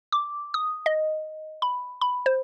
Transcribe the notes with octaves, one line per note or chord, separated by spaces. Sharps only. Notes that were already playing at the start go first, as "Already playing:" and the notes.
D6
D#6
D#5
B5
B5
C5